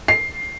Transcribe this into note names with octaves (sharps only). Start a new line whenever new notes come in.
C7